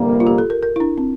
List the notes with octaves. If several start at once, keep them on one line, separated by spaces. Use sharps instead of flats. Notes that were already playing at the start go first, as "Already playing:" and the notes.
Already playing: G1 F2 C3 G3 A#3
F4
G4
A4
A#4
A#4
E4
D4
C4